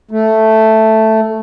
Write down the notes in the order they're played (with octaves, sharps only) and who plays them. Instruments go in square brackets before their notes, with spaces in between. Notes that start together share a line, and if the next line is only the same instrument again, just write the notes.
[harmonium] A3